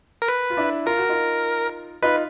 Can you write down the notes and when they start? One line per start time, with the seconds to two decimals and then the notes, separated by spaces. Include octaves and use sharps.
0.22 A#4
0.28 B4
0.50 F4
0.57 D4 E4
0.86 F4 A#4
0.98 F#4
1.09 D#4 F4
2.02 D#4 F4 B4